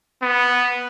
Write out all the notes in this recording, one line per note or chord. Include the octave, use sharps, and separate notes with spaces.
B3